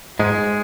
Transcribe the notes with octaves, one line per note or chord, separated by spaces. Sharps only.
G#2 G#3